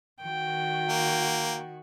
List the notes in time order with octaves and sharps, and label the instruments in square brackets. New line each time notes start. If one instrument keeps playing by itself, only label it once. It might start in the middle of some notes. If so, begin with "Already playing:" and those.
[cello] D#3 F#4 [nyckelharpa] G5
[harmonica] A#3